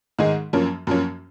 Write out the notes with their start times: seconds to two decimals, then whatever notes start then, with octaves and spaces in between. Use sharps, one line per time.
0.19 G#2 D#3 G#3 D#4 G#4
0.53 F#2 F3 A#3 C#4
0.87 F#2 F3 A#3 C#4